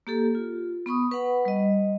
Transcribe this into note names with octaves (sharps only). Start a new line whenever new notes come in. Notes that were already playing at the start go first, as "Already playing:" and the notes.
A#3 G4 A4
F4
B3 B5 C#6 D#6
B4 F#5 B5
G3 D#5